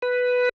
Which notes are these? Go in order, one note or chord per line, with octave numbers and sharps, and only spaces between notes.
B4